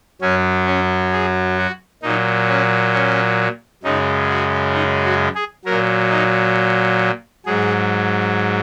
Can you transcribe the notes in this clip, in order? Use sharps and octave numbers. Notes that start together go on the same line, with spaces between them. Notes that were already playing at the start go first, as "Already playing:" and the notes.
F#2 F#3 C#4
C#4
G#4
F#4
A#2 F#3 D#4
C#4
C#4
F#2 C#3 G#3 D#4
F#4
D#4
F#4
G#4
A#2 F#3 A#4
D#4
G#2 F#3 G#4